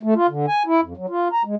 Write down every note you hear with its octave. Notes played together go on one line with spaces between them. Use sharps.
A3
F4
D3
G#5
E4
F2
F#3
F4
A#5
G#3